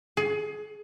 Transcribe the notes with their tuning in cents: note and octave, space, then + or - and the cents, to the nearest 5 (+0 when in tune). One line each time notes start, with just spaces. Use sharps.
G#4 +25